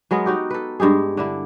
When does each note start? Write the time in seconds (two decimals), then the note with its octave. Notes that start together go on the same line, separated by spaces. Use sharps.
0.11 F#3 G#3 B3 A#4
0.26 D#4 F#4 G4
0.50 A4 B4
0.80 G2 G#3 G4 G#4
1.17 D3 D4 E4